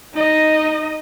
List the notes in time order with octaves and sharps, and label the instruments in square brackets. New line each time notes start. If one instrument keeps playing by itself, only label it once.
[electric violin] D#4 D#5